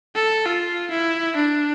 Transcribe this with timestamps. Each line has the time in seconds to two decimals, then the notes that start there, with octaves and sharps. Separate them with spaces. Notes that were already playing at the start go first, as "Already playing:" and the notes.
0.15 A4
0.45 F4
0.91 E4
1.36 D4